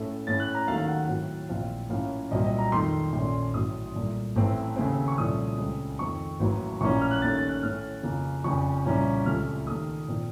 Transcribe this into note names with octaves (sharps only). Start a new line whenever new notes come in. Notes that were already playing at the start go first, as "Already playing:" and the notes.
Already playing: A2 A3 C#4
A2 A3 C#4 A6
F#6
A#5
D#2 D#3 F#3 A3 F5
F5
F#5
F#5
A2 F#3 C4
A#1 A2 F3 C4 F5
A2 F3 A#3 C#4 F5
C2 A#2 F#3 C4 D#5
D#5
A#5
F2 D#3 A3 C6
A#1 A#2 A3 C#4
A1 A2 F#3 D#6
C2 A#2 A3
A1 A2 A3 C4
D#2 C#3 A3 C4
C#6
C2 A#2 F3 A3 C#4 D#6
C#2 C#3 A3 C4
F2 D#3 A3 C4 C#6
A1 A2 F#3 A#3
A#1 A2 F3 A#3 C#4 C#6
F6
F#6
D#2 D#3 A3 C#4 A6
A6
F#6
A2 A3 C#4 F6
F2 C#3 F3 A#3 C#4
F1 F2 C#3 F3 C#6
C2 A#2 F3 A#3 C#4
C#2 C3 F3 A3 F6
D#2 D#3 A3 D#6
A#2 F3 C4